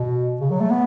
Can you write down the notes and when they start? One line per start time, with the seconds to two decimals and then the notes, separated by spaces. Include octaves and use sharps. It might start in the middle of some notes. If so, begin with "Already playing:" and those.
Already playing: B2
0.41 C#3
0.51 F#3
0.60 A3
0.70 B3